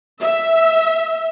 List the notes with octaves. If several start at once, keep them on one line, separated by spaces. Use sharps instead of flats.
E5